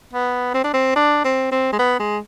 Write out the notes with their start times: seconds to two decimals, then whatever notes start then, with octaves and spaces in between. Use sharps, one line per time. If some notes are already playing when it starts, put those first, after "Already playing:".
0.13 B3
0.54 C4
0.64 D4
0.73 C4
0.96 D4
1.24 C4
1.52 C4
1.72 G#3
1.79 B3
1.99 G#3